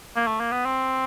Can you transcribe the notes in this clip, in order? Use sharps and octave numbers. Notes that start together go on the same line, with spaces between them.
A#3
A3
A#3
B3
C4